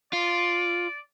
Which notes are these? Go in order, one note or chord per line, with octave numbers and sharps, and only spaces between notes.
F4 D5